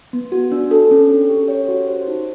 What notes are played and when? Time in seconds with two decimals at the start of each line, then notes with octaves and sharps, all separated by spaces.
0.13 B3
0.32 F#4
0.52 D4
0.71 A4
0.91 C#4
1.09 A4
1.29 G4
1.48 C#5
1.68 F#4
1.88 C5
2.08 D#4